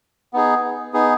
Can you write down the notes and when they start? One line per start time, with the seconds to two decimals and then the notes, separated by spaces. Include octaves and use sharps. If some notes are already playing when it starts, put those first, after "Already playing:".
0.33 B3 D#4 G#4
0.93 B3 D#4 G#4